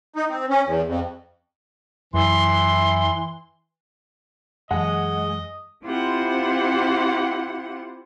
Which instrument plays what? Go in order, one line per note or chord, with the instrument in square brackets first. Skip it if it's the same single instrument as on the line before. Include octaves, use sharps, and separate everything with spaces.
[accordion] D#4
C4
C#4
E2
F2
[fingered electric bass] F#2 [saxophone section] E3 [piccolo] C6
[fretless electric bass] F#2 E3 F#3 [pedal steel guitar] G#3 [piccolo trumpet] D#5 [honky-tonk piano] F#5
[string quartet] C4 E4 F4 G4 C5 F#5